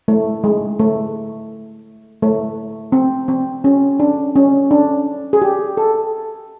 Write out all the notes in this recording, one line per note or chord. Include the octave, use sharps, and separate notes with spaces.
A3
G#3
A3
A3
C4
C4
C#4
D4
C#4
D4
G#4
G4
A4